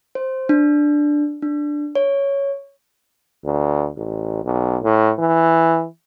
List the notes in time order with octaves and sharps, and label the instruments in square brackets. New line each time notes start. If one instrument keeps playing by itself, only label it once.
[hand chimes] C5
D4
D4
C#5
[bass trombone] D2
A1
B1
A2
E3